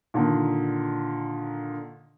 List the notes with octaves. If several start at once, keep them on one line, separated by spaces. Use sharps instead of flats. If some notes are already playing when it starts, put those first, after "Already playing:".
A#2 D3 D#3